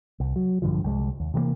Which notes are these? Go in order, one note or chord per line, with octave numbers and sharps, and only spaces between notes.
C2
F#3
A#1 G2 D3 F3
C2 G#3
D#2
C3 E3 F#3 A#3